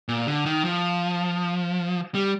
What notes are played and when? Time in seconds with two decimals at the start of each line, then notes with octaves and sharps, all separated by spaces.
0.09 A#2
0.27 D3
0.46 D#3
0.65 F3
2.15 G3